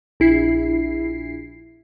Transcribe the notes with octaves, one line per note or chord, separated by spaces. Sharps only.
A#1 E4 C7